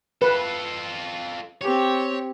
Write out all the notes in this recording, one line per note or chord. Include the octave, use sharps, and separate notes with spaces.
F4 A4 B4
C4 G4 C#5